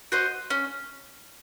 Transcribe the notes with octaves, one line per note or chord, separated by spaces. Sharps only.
F#4 C5 D#5
C#4